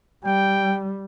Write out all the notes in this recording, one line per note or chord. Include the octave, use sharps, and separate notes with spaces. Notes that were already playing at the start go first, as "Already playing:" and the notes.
G3 G5